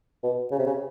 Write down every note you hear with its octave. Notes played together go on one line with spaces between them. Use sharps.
B2
C#3
C3
C#3